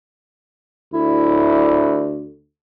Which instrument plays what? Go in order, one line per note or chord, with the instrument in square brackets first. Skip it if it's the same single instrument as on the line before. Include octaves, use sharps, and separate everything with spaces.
[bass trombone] D2 [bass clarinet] E4